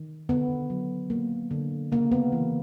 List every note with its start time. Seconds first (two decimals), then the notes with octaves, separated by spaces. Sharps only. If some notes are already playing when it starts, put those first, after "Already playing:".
Already playing: D#3
0.29 D3 B3
0.70 F#3
1.10 A#3
1.51 D3
1.92 C#3 A#3
2.12 B3
2.32 E3